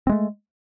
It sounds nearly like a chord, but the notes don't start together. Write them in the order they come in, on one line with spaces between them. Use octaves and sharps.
C4 G#3 A3